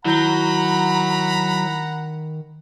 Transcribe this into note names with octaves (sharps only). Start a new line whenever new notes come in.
D#3 F#3 E4 F#5 A#5 B5 G6 G7